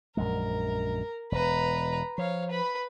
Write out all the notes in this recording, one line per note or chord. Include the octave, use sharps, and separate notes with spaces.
A#1 F#2 G#3 A#4
E1 B4 A#5
F3 C#5 F5
B4 B5